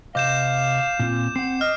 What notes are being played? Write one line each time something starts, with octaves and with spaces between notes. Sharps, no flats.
C3 C5 D#5 F5 D6 G6 E7
A#2 C4 F4
C4 F#5 C7
D#5 F6